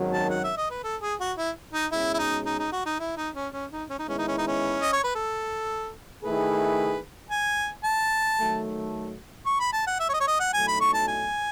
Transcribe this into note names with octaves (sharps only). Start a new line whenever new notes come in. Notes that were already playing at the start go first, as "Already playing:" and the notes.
Already playing: G#1 F#2 D#3 F#3
A5
F#5
E5
D#5
B4
A4
G#4
F#4
E4
D#4
B2 G#3 C#4 E4 G#4
E4
D#4
D#4
D#4
F#4
D#4
E4
D#4
C#4
C#4
D#4
C#4
D#4
D#3 G#3 B3 C#4 E4
D#4
C#4
D#4
C#4
D#5
C#5
B4
A4
D#3 A3 E4 G#4 B4
G#5
A5
D#3 F#3 A3
C#6
B5
A5
F#5
E5
C#5
D#5
C#5
D#5
F#5
B1 A2 F#3 A3 D#4 G#5
B5
C#6
A5
G#5